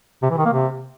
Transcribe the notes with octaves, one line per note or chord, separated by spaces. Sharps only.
C3
E3
D#3
A#3
C3